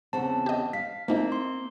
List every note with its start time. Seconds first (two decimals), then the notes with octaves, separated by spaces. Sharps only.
0.13 E2 C#3 C4 A5
0.46 G4 D#5
0.73 F5 B6
1.08 A3 A#3 C4 D#4 E4
1.32 C6